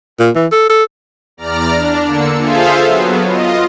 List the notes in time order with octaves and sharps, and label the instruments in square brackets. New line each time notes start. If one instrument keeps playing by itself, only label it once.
[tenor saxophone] A#2
E3
A4
A4
[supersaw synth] E2 D5 A#5 F6
D4
D3 A#3 E6 C#7
F4 G#4 A4 C5 E5 F5
F#3 B3
F4 D#5